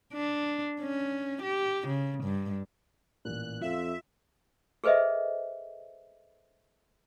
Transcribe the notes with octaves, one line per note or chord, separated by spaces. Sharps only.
D4
C#4
G4
C#3
G2
A1 A#2 F#6
F2 F4 E5 F5
G#4 A4 B4 C5 D#5 E5